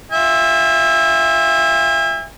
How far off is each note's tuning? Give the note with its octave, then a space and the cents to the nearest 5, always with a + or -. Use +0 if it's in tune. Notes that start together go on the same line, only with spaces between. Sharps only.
F4 +5 E5 +0 G#5 -45